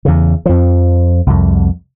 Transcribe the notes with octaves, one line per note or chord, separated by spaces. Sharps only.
E2 C#3
F2 F3
C2 F2